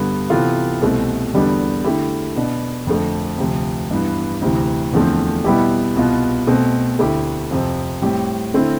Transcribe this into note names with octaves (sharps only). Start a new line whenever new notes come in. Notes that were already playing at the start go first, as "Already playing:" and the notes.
Already playing: G2 D3 G3 B3
C3 E3 B3 F4 A4
C2 B2 A3 C4
E2 D3 G3 B3 D4
D3 A3 E4 G4
B2 B3 D4
F2 D3 F3 A3
D2 C3 F3
G2 E3 B3
D2 C3 E3
E2 D3 F3 A3 C4
B2 G3 B3 E4 G4
C2 B2 B3 F4
B2 A3 C4
D2 D3 A3 E4 G4
F2 C3 F3 C4
A2 G3 C4 G4
D3 A3 C4 E4